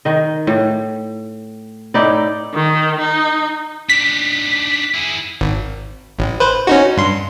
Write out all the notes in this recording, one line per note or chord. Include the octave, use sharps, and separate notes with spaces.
D#3 D#5
A2
A2 D#4 E4 D5
D#3
D#4
D4 D#4 B6
E4 G#4
G#1
A1
B4 C5
C#4 D#4 F#4
G2 C6